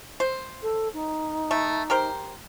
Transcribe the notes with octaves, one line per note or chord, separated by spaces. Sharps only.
C5
A4
D#4
A3
G4 A#4 C5